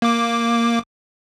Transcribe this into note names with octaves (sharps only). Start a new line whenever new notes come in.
A#3 D6